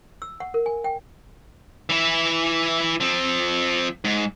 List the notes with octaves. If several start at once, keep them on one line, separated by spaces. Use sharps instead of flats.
E6
F#5
A#4
G#5
G5
E3 E4
F3 C4
G#2